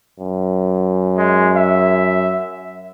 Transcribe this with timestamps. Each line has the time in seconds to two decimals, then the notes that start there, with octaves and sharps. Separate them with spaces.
0.20 F#2
1.17 G#3
1.56 E5